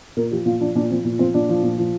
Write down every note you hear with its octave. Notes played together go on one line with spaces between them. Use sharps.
A#2 A#4
F3 G4
A#2 F4
F3 D4
A#2 D4
F3 C4
A#2
F3 C4
A#2 D4
F3
A#2
F3